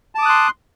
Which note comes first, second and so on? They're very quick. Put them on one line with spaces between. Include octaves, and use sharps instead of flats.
A5 D6 D#6 F#6 C6